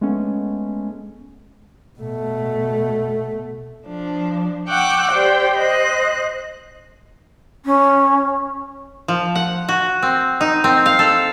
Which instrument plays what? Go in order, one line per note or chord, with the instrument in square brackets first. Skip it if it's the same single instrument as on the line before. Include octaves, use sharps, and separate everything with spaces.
[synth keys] G#3 A3 B3 C#4
[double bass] B2 A3
[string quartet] F3 D4
F#5 G5 C#6 D6 E6 F#6
G4 C5 D5 G5
C5 D#5 F#6
[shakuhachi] C#4
[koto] F3
F#5
F#4
C4
D#4
C4
F5
A4